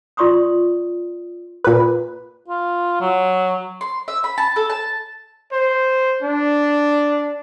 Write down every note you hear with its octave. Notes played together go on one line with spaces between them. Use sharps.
F4 D5 C6 C#6 D#6
A#2 B4
F4
F#3
C6
E5
B5
A5
A4
A5
C5
D4